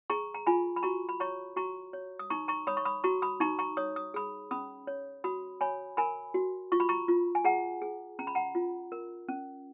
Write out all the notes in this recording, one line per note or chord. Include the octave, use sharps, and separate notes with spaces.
G#4 A#5 C#6
A#5
F4 G#5 B5
B5
F#4 A#5 C#6
B5
C#5 A#5 C#6
F#4 A#5 C#6
C#5
D#6
D#4 A#5 C#6
A#5 C#6
C#5 B5 D#6
C#6
B5 D#6
F#4 A#5 C#6
B5 D#6
D#4 A#5 C#6
A#5 C#6
C#5 D#6
D#6
G#4 B5 D#6
C#4 B5 D#6
C#5
F#4 B5 D#6
C#5 G#5 B5
A#4 G#5 B5
F#4
F4 C#6
B5
A#5 C#6
F4
G#5
G#4 F#5 A#5
G#4
C#4 A#5
B5
F#5 A#5
F4
A#4
C#4